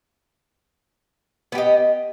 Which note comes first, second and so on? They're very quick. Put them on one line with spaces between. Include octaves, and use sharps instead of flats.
B3 G4 D#5